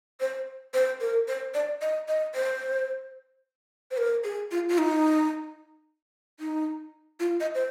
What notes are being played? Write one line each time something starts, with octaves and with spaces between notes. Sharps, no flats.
C5
C5
A#4
C5
D5
D#5
D#5
C5
C5
A#4
G#4
F4
F4
D#4
D#4
F4
D#5
C5